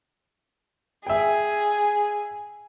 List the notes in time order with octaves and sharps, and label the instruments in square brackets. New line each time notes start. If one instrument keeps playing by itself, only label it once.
[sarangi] G#4 [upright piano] E5 G5